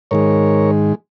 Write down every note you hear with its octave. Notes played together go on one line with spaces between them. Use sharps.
G#2 D#3 G#3 A#4 C#5